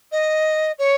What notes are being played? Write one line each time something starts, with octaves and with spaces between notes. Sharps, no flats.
D#5
C#5